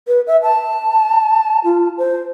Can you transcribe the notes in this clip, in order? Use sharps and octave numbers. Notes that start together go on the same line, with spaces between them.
B4
E5
A5
F4
C5